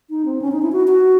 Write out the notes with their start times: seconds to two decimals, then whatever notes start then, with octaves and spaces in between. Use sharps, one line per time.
0.10 D#4
0.26 C4
0.42 C#4
0.52 D#4
0.62 E4
0.72 F#4
0.87 F#4